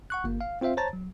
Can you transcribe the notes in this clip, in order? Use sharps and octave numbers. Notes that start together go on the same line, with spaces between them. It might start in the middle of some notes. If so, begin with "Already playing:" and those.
F#5 C#6 F#6
G1 A#3
F5
C4 F4 C5 E5 F5
C5 C#5 A5 A#5 A6
F#3